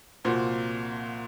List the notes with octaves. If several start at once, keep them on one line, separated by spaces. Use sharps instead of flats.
C2 A#2 F3 C4 F#4